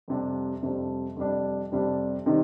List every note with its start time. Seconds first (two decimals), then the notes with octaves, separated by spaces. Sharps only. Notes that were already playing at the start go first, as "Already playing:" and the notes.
0.08 F2 C3 G3 D4
0.63 F2 C3 G3 D4
1.16 F2 C3 G3 D4
1.72 F2 C3 G3 D4
2.26 C3 D#3 G3